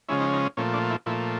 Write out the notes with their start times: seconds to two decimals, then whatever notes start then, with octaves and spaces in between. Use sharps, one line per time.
0.08 C#3 F3 G#3 C#4 E4
0.20 D#4
0.33 D#4
0.57 A#2 F3 A3 C#4
0.74 D4
0.90 E4
1.06 A#2 F3 A3 E4